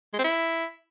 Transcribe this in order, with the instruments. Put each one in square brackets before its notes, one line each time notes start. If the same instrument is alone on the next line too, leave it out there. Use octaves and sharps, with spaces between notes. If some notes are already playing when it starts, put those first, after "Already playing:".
[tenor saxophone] G#3
C4
E4